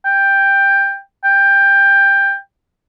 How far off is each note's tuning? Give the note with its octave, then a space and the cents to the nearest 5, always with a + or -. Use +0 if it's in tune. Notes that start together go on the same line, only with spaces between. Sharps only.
G5 +10
G5 +15